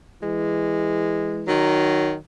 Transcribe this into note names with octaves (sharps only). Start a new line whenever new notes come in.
E3 G#3
D#3 F#3